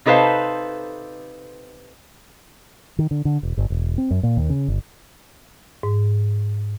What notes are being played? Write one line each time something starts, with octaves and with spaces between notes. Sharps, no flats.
C3 D#4 A4 B4 C5 F5
D#3
D3
D3
E1
G1
E1
C4
F#2
A#2
D#2
C#3
G1
G#2